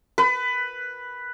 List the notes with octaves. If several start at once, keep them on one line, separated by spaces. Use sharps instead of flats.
B4